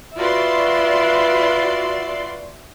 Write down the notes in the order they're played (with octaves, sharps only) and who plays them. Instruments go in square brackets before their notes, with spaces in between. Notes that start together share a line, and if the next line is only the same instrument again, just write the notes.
[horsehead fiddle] F4 B4 [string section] F#4 D5 C6 [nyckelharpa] E5